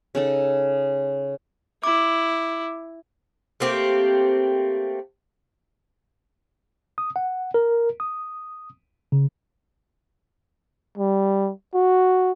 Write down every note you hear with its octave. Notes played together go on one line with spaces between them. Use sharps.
C#3 D#4 A4
E4 D6
A3 A#3 C4 G4
D#6
F#5
A#4
D#6
C#3
G3
F#4